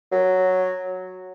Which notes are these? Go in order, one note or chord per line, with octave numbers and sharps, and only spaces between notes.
F#3